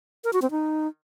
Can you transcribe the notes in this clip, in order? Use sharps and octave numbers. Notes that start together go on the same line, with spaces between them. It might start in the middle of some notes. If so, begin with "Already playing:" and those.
A#4
F#4
C4
D#4